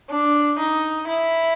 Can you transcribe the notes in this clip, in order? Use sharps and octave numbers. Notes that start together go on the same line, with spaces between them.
D4
D#4
E4